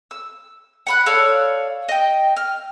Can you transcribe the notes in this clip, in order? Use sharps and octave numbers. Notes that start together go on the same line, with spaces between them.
E6
F#5 B5 F#6
A4 C#5 D5 F5
D#5 G5
F6